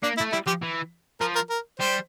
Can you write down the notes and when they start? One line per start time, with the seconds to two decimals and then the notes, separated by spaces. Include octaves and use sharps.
0.03 A#3 D4
0.18 E4
0.21 A3
0.32 G3 E4
0.47 F3 G4
0.62 E3
1.20 F3 A#4
1.35 A#4
1.50 A#4
1.80 G3 C5